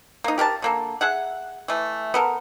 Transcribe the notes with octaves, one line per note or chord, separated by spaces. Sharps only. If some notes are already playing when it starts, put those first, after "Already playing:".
A#3 D#4
G4 A#4 F5 A5
D3 A#3 A4
G#4 E5 F#5
E3 A3
B3 A4 A#4